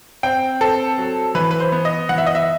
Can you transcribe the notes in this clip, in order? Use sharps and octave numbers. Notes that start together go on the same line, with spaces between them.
C4 G5
C4 A4
F#3
E3 B4
B4
C5
B3
D#5
E3 F#5
E5
D#5
E5